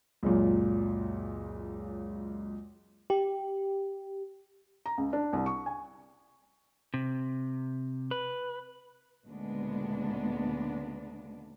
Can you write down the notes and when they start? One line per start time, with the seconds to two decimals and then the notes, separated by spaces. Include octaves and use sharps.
0.23 C#2 F#2 A#2
3.10 G4
4.86 A#5
4.98 C#2
5.13 D4
5.33 C2
5.46 C#6
5.66 G#5
6.94 C3
8.11 B4
9.26 D2 A#2 C#3 G#3 B3 D4